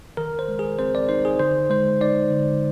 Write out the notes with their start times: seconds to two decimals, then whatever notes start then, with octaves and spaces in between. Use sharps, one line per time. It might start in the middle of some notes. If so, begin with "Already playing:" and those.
0.17 D#3 A#4
0.39 C5
0.48 G#3
0.59 G#4
0.79 C4 C5
0.95 D5
1.09 D#4 C5
1.25 G#4
1.39 D3 C5
1.70 G#3 C5
2.01 D#4 D5
2.31 D3